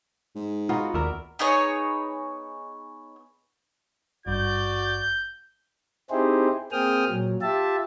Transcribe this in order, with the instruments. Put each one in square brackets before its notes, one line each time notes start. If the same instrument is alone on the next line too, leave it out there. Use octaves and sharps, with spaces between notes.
[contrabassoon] G#2
[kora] B3 D#4 F#4 [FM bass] F4
[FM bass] D#2 [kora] A#4 D5 E5
[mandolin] B3 D#4 G#4 C#5
[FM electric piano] G#1 G2 [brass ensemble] F#4 D5 [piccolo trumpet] G6
[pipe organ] C4 D#4 E4 G4 G#4 C5
A#3 C4 G#4 G5 D#6 F6
A#2 F#3
F4 G4 E5 A5